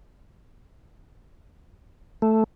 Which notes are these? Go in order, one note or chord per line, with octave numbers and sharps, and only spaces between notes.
A3